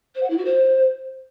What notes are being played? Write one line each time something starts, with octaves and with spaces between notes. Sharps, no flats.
C5
F#5
E4
F#4
C5